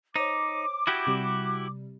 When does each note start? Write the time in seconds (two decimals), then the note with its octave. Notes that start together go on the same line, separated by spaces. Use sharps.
0.16 D#4 C5 C#5 D6
0.87 E4 F#4 G4 D#6 G6 G#6
1.07 C3 G3